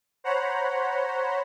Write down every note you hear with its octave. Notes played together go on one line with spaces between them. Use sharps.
C5 C#5 F#5 A#5 B5